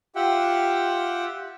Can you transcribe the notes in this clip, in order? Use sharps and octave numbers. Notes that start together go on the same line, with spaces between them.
F4 G4 E5 F#5 G5